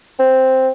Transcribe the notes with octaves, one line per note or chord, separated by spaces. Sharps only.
C4